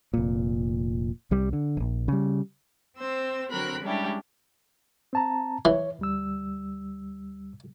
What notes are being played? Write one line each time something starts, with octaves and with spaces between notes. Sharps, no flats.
F1 A#2
C2 G3
D3
D#1 A#1
C#3 G3
C4 C5 E6
D3 F#3 C4 A#4 B5 F#6
G3 G#3 C#4 D4 E4 G4
C4 A5 A#5
E3 C#5
D2 G3 E6